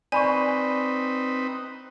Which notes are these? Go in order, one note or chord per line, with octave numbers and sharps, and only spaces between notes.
C4 D#4 B4 D5 G#5 B5 C#6